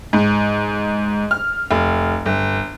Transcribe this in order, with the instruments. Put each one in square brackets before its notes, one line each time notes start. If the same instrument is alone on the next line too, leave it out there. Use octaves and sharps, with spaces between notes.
[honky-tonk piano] G#2
F6
F1
G1